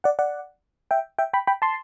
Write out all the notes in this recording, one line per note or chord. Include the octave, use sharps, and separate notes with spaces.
D5 F#5
D5 F#5
E5 G5
E5 G5
G5 B5
G5 B5
A5 C6